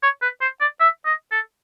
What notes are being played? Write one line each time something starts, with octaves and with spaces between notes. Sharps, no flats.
C#5
B4
C5
D5
E5
D#5
A4